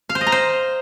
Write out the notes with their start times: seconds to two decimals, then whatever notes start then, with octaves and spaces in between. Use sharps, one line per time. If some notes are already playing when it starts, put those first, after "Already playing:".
0.09 F5
0.15 C5
0.21 D#5
0.27 A#5
0.32 C5